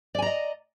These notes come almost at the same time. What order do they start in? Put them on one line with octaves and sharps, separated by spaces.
D5 G#5 A#5 D#5